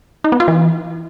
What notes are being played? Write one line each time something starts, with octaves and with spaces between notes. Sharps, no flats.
D#4
B3
F4
E3